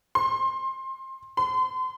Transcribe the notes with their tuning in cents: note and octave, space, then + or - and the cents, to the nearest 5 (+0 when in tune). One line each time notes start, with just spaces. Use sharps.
C6 +25
C6 -35